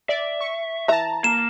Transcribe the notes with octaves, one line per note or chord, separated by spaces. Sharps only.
D5 E5
C#6
E3 E5 A5 A#5
A#3 E7